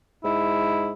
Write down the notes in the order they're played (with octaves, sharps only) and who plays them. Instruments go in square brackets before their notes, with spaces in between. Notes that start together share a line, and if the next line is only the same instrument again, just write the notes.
[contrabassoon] G#2 [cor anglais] E4